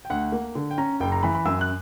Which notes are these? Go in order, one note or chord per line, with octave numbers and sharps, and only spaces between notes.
G5
D2 F#5
A#3
D3
G5
C#4 A#5
F#1 G5
A#5
E3 B5
B5
F#2 E6
F#6